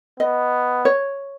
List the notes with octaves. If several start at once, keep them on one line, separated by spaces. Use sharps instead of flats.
B3 D#5
C#5